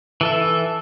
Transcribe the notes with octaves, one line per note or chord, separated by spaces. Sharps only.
E3 A4 E5